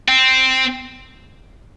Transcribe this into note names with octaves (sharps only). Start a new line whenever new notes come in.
C4